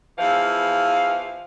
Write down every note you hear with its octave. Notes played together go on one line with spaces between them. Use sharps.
E2 E3 F3 F5